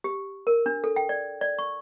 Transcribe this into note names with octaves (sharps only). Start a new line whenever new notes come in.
G4
A#4
D4
A4
G5
D5
D5
C#6